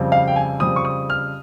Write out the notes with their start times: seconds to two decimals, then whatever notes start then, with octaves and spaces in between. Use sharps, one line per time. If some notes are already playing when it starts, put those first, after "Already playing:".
Already playing: F2 C#3 G3 C4
0.12 F5
0.28 G5
0.36 G#5
0.60 F2 C#3 G3 C4 D#6
0.76 C#6
0.85 D#6
1.10 F6